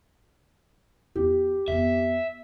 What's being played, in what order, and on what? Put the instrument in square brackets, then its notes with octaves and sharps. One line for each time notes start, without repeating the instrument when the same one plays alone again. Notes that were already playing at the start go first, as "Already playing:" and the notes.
[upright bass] E2 [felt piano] G4
[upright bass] F2 B3 [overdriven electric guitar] E5